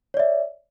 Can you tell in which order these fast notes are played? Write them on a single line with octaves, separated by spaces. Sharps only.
C#5 D5 E5